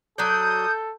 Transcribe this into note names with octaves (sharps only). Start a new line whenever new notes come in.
F#3 A4 D5 D#6 G6